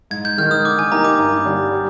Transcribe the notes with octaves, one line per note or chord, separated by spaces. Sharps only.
G#2 G#6
G6
D#3 G#3 F6
D#6
D3 D6
G#5
G3 A#3 D#4 G4 A#5
D6
G2
D3 G3 D4
G3